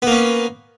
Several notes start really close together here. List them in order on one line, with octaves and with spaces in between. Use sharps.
B3 A#3 C#4